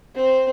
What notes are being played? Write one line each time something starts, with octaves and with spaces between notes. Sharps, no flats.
C4